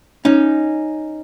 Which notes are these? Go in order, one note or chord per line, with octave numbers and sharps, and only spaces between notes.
C#4 D#4